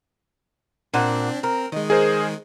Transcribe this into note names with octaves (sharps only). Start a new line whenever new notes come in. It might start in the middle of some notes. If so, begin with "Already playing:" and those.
A#2 C4 D4 F#5
C4 A#4
D#3 G#3 D#5
G#4 A#4 C5